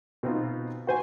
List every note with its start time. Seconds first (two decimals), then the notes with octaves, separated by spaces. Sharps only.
0.23 B2 C4 D#4 F4
0.87 F#4 C5 G#5